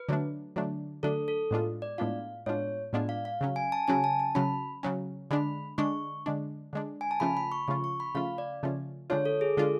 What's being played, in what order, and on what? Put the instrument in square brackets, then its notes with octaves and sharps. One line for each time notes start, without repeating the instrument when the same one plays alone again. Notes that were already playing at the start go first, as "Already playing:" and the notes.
Already playing: [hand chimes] B4
[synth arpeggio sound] D3 F#3 A3 D4
D3 F#3 A3 D4
[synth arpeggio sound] D3 F#3 A3 D4 [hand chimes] A4
[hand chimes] A4
[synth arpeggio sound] A2 G#3 B3 D4 F4
[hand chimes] D5
[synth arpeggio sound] A2 G#3 B3 D4 F4 [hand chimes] F5
[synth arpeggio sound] A2 G#3 B3 D4 F4 [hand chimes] C#5
[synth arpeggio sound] A2 G#3 B3 D4 F4 [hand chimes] D5
[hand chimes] F5
F5
[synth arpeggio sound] C#3 F#3 C#4
[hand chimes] G#5
A5
[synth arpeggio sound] C#3 F#3 C#4 [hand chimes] G#5
[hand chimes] A5
A5
[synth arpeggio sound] C#3 F#3 C#4 [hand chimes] B5
[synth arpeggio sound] C#3 F#3 C#4
[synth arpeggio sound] D3 G#3 D4 [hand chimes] B5
[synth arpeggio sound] D3 G#3 D4 [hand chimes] C#6
[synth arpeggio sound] D3 G#3 D4
D3 G#3 D4
[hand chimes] G#5
A5
[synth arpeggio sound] C#3 F3 A3 C#4 F4 [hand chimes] B5
[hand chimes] B5
C#6
[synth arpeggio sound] C#3 F3 A3 C#4 F4 [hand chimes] C#6
[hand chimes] C#6
B5
[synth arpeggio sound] C#3 F3 A3 C#4 F4 [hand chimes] F5
[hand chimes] D5
[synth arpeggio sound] C#3 F3 A3 C#4 F4
[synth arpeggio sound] D3 G#3 D4 F4 [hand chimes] C#5
[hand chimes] A4
G#4
[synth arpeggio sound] D3 G#3 D4 F4 [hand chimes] A4